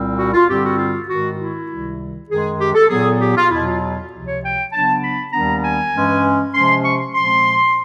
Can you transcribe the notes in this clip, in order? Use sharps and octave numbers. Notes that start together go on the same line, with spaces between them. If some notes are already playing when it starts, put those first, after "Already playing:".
Already playing: C2 A#2 G3 C4
F#4
F4
G2 D3 G3 C4 G4
F#4
F4
G#2 D#3 G#3 F#4
E4
C#2 C3 D#3 G3
F#2 D#3 G#3 G#4
G4
A4
A#2 F#3 B3 G#4
G4
F4
E2 B2 F#3 E4
F4
C#2 C3 F3
C#5
G5
C#3 F#3 B3 D4 A5
B5
D#2 D#3 G3 B3 D4 A#5
G#5
G2 E3 G#3 C#4
C3 F3 G#3 C#4 C6
C#6
A#2 F3 G#3 C4 C6